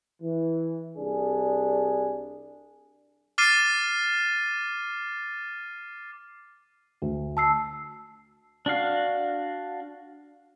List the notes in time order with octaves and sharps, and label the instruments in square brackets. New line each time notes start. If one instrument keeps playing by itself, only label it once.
[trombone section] E3
C2 D4 G#4
[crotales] D6 F6 A6 C7 D#7
[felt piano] D2
[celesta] A5 E6 C7
[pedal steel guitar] D4 F#4 F5